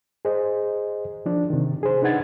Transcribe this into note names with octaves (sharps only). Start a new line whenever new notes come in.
G#4 C5 D#5
F3 D4
C3 D#3
G#4 C5
D4 D#4 B4 F#5 G#6 A6